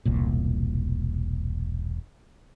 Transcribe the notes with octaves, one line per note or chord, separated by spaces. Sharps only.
E1 C2 A#2